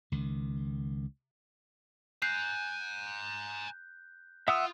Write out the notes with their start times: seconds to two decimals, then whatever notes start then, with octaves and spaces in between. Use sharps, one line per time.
0.12 C#2 D#3
2.22 G#5 A#5 F#6 G6 C7
4.48 F4 E5 F#5 D#6 E6